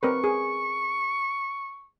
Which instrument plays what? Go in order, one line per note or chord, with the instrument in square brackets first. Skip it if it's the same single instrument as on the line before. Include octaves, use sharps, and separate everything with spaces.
[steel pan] C4 A#4 B4 [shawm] C#6
[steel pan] G#4